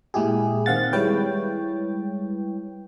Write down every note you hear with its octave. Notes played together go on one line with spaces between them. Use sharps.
A#2 G#3 E4 G4 G#4
D#3 C4 F5 F#5 A6
G3 G#3 E4 B4 C#5 G5